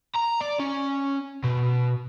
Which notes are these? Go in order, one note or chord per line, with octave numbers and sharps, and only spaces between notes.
A#5
D5
C#4
B2